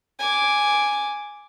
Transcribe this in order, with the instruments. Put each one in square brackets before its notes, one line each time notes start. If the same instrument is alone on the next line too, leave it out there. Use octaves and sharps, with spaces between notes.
[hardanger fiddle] G#5 D6